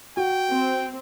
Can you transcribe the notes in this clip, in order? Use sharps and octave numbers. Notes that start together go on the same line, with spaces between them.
F#4 G5
C4